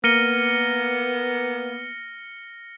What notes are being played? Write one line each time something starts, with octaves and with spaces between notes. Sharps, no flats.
A#3 B3 F6 A#6 C#7 D#7 G7